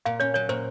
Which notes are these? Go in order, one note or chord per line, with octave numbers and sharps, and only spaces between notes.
A#2 F5
C#4 C#5
F#3 C#5
A#2 C5